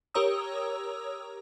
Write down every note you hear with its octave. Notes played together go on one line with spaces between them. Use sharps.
G4 A#4 C#5 A#5 D#6 E6